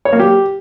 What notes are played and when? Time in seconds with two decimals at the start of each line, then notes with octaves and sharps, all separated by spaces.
0.05 C#5
0.12 A#3
0.20 G4